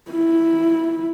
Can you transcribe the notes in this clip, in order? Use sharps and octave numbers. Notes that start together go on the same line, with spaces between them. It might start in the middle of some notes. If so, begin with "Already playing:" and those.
E4